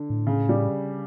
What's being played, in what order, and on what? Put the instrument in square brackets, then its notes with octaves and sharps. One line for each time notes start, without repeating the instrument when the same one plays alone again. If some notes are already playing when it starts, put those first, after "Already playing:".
Already playing: [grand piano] D3
[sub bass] A2
[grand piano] C#3
G3